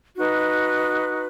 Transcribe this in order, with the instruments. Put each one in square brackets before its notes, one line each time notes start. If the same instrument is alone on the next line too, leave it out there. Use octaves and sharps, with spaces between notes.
[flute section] D#4 F#4 B4